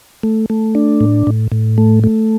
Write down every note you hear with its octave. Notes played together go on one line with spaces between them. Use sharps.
A3
A3
D4
A2
A2
A2
A3
A3